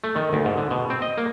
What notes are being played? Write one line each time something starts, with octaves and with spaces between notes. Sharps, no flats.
A3
D#3
D2
G#2
D3
B2
C4
D#5
A#3